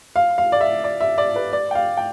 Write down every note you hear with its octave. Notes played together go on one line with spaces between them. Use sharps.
F5
F5
D5
E5
D5
E5
D5
B4
D5
G5
F5
G5